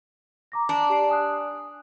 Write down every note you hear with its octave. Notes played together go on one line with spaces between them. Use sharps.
A#5 D6 A#6
D4
G4 D5 C7
G#5 D#6 F#6